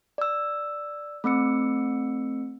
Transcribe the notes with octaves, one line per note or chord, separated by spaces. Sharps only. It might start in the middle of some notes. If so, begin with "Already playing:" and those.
D5 E6
A3 C4 E6 C#7